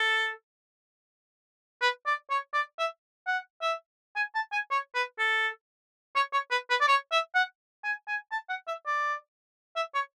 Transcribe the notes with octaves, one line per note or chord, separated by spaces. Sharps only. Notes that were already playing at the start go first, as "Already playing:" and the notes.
Already playing: A4
B4
D5
C#5
D5
E5
F#5
E5
G#5
A5
G#5
C#5
B4
A4
C#5
C#5
B4
B4
D5
C#5
E5
F#5
G#5
G#5
A5
F#5
E5
D5
E5
C#5